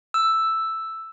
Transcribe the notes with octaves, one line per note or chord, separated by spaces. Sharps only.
E6